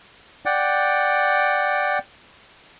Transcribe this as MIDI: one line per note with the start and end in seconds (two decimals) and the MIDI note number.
0.46 1.98 74
0.46 1.98 78
0.46 1.98 79